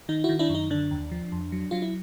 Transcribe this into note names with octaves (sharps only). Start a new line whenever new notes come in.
D#3 D#4
E4 F#4
D#3
D4 E4
F#2
D#4
D3 D4
D#2
F3
F2
F#3
F#3 F4
E4